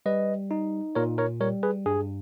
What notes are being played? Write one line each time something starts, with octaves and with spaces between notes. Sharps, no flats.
G3 B4 D#5
D#4
A#2 A#4 C#5
A#4 C#5
G3 A#4 C#5
G#4 B4
G2 G#4